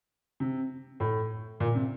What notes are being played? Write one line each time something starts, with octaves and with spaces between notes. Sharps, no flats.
C3
A2
A#2
C3